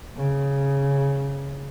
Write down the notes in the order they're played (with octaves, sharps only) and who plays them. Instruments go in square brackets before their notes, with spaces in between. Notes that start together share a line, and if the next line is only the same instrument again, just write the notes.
[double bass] C#3